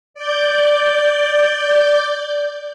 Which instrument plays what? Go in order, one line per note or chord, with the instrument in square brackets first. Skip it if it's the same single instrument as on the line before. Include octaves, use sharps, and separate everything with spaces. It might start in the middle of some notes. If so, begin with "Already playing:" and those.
[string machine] D5 G6